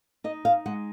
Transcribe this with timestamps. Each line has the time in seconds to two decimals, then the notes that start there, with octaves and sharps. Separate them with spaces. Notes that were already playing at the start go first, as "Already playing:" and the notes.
0.24 D#4 D#5
0.45 F5
0.66 G#3 F#5